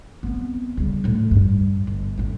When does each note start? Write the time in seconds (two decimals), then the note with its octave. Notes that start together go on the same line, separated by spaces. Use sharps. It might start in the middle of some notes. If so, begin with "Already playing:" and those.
0.23 B3 C4
0.77 C#3 G3
1.04 A2 F3
1.31 G2
1.87 G1
2.17 A1 F2